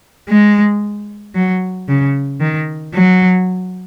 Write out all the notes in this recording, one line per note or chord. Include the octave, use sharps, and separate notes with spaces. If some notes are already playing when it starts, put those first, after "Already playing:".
G#3
F#3
C#3
D#3
F#3